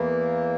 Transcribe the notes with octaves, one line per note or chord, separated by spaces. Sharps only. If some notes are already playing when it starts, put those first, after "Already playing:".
Already playing: E2 E3 A#3